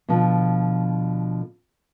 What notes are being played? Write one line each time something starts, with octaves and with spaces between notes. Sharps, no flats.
B2 D3 F3